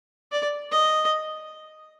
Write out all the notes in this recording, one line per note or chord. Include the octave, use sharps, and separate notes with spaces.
D5
D#5